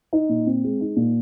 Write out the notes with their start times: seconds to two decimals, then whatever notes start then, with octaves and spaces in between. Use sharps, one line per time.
0.13 D#4
0.29 A#2
0.47 C4
0.64 G#3
0.81 D#4
0.96 A#2